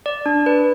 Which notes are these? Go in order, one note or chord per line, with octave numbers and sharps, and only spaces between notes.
D5
D4
B4